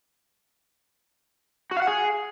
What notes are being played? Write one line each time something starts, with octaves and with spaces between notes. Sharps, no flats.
F#4
F5
F#5
G#4